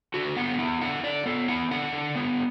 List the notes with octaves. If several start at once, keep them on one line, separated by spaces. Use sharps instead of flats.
D3 F#4
B3 F#5
E4 F#5
D3 F#5
D3 D5
B3 A4
E4 F#5
D3 F#5
D3
B3